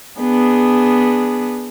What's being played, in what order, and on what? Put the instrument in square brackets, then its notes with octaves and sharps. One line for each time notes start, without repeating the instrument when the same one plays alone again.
[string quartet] B3 D4 G#4